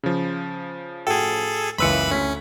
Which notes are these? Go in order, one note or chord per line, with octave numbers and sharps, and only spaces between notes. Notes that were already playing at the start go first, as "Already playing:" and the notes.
C#3 F3
A2 F#4 G#4 A4 G5
F#1 C#2 E3 B4 B5 C6 E6 C#7
D2 C#4 B6